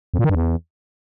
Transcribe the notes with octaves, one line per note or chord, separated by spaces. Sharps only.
F2
A#2
D#3
G2
E2